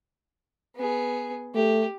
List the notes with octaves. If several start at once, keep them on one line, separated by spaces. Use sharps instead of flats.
B3 G#4
A3 G4